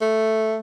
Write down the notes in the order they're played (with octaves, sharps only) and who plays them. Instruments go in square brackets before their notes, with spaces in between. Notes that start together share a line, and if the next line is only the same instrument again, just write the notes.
[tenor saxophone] A3